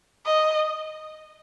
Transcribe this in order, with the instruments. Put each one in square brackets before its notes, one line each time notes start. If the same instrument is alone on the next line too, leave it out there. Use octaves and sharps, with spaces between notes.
[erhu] D#5